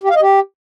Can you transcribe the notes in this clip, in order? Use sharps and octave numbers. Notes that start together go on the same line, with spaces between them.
G4
F5
D#5
G4